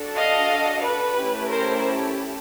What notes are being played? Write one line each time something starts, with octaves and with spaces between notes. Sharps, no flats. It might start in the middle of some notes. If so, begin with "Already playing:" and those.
Already playing: D4 F#4 A4
D#5 F5
B4
A3 C#4 E4 G4
A#4 C5